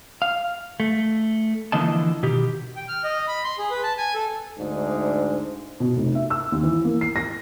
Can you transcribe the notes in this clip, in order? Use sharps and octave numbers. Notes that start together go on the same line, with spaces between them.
F5
A3
D3 E3 F3 A#3 D#5 A5
B2 D#3 G4
G5
F6
D#5
B5
C6
G#4
B4
A5
G#5
A4
D2 G#2 D4
B2
F1
E5
E6
D#2
E3
A#3
C7
A#6